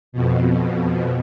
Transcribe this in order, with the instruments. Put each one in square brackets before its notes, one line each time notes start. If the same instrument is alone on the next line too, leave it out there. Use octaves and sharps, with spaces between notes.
[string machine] F2 B2